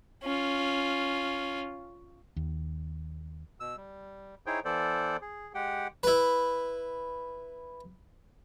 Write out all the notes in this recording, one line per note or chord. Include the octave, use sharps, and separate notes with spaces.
C#4 F4
D#2
B2 E6
G3
D#4 E4 G#4 C5 C#5 G5
E3 B3 A4 C5 D5
G#4
G#3 G4 F#5 G5
E4 B4